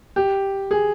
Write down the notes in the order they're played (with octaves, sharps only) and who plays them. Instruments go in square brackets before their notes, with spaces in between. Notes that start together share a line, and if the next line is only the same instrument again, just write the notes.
[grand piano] G4
G#4